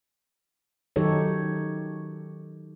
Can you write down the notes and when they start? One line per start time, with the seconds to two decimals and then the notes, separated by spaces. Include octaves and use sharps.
0.96 D#3 F#3 D#4 G4 A4 C#5